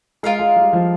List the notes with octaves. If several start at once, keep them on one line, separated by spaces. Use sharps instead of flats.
G#3 F4 A#4 F5
G#3
G3
F3